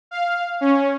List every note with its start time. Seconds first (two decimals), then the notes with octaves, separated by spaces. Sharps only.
0.11 F5
0.61 C#4